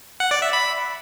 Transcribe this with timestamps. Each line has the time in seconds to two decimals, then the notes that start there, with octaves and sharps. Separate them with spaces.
0.20 F#5
0.31 D5
0.42 E5
0.53 B5